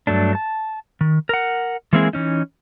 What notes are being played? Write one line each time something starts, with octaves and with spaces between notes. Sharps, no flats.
G2 F#3 A3 D4
A5
D#3
A#4 F#5
E3 G#3 A#3 C4 E4 G#4
E3 C#4 D#4